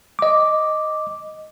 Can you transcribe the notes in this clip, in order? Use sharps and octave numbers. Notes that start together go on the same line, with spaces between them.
D#5 D6